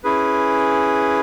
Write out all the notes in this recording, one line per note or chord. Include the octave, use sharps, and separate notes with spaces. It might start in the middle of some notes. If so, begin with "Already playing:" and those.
C#4 E4 G#4 B4